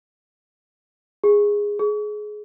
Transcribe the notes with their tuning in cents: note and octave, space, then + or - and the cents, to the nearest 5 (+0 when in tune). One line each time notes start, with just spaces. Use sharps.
G#4 -10
G#4 +20